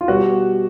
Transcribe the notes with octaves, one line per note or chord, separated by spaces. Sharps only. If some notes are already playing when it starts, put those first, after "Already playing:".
F4
B2 G3 F#4